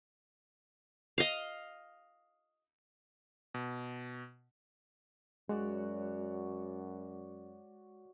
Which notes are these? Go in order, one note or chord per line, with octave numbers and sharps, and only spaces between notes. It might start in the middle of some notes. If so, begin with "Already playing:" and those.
D#5 F5
B2
F#2 G#3 F#4 C#5 D5